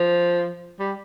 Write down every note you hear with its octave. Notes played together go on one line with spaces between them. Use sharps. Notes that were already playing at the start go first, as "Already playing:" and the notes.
Already playing: F3
G3